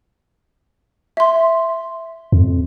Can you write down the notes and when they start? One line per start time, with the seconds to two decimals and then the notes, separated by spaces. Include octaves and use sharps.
1.17 E5 C6
2.32 F2